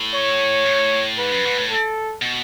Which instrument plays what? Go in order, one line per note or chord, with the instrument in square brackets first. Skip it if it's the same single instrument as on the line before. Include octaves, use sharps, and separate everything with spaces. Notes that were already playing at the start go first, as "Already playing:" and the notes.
Already playing: [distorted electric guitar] A2
[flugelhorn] C#5
[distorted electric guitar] A2
[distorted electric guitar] G#2 [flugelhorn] B4
[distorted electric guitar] F#2
G#2
A2
[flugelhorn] A4
[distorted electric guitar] B2